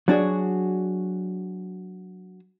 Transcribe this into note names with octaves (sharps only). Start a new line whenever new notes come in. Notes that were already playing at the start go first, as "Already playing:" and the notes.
F#3 D4 F#4 G#4